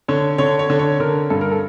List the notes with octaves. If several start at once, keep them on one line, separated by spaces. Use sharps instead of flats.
D3 C#5
D3 C#5
C#5
D3
C#5
D3 A#4
G2 A4
A#4
A4